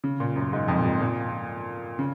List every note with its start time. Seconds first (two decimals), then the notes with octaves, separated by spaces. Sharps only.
0.04 C#3
0.20 A#2
0.36 F#2
0.53 G#2
0.68 F2
0.77 A#2
0.85 G#2
1.01 A#2
1.99 C#3